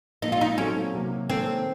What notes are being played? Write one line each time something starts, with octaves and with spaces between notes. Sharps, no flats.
A#2 F3 A#3 D#4
F4
D#4
F#3 C4 C#4 F#4 A4
C3 D#3 F#3 A#3
D#3 A#3 C4 C#4 A4